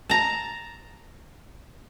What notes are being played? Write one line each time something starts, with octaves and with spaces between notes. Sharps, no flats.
A5 A#5